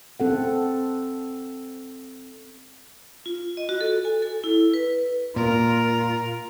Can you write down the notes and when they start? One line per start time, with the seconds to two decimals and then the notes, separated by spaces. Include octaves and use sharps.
0.20 C4 A4 F#5
3.26 F4
3.57 D#5
3.69 F#4
3.81 A4
4.05 G#5
4.22 A4
4.44 E4
4.74 B4
5.36 A#2 F4 A#4